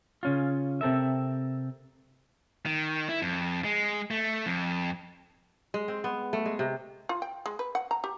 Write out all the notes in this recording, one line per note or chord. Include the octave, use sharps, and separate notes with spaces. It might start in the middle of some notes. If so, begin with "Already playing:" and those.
C#3 C#4 F4
C3 C4 A4 A#4 E5
D#3
E4
F2
G#3
A3
F2
G#3
C4
B3
A3
G#3
C3
F4
G5
G#3
B4
F#5
A#5
G4